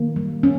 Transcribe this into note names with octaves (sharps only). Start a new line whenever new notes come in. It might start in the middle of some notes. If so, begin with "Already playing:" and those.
Already playing: D#3 A#3
G3
C#4